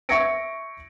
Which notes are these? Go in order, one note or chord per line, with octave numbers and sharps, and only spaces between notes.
E5 C#6 G#6 A#6 C#7 D7